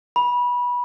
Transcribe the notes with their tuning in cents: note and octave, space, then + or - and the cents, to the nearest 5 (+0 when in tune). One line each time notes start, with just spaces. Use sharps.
B5 -20